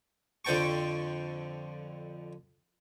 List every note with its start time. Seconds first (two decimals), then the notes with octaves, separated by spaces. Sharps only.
0.45 F2 D3 C5 G5 A5 C#6